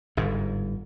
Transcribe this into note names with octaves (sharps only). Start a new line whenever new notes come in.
G1 G#2